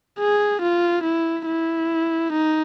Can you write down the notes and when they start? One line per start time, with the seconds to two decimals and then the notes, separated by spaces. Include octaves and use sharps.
0.19 G#4
0.62 F4
1.04 E4
1.46 E4
2.32 D#4